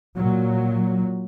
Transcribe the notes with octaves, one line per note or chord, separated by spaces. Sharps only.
A#2 F#3